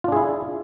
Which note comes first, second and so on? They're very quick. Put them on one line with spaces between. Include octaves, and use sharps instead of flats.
F4 D4 G#4 E4